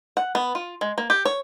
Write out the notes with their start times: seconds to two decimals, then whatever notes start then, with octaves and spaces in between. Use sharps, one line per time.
0.17 F#5
0.35 B3
0.55 F4
0.81 G#3
0.98 A#3
1.10 G4
1.25 C#5